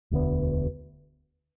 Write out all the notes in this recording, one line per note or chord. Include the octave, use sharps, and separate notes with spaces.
E1 D2 D3 B3